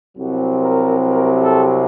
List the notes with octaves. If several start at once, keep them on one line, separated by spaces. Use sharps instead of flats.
C2 C3 F#3 C4 F#4
A#4
A#4
A4